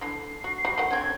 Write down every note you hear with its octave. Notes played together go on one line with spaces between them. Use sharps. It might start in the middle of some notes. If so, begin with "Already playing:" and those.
D3 E3 C7
F#4
G3 F#4
D#3 A3 F#5
D3 C4 C#4 G#6